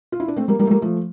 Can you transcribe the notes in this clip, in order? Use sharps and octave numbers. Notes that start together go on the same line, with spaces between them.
F4
E4
D4
A3 C4
G3 A#3
G3 A#3
A3
G3 A#3
F3 A3